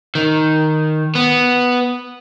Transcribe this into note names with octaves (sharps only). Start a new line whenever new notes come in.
D#3
B3